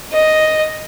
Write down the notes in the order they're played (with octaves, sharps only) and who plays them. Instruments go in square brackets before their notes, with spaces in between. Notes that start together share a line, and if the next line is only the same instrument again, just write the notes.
[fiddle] D#5